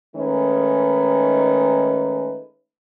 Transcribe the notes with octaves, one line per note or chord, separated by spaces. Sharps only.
D#3 G#3 A3 C#4 D#4 B4